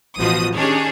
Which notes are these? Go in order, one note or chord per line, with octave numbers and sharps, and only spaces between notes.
A1 B2 F3 F#4 D#6
D#3 C#4 D4 G4 G#4 C#5